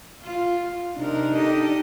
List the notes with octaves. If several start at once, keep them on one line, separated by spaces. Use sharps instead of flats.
F4
C3 D4 D#4 A#4
G4 A4 D#5